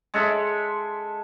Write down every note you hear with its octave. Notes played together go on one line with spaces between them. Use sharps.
G#3 A4 E5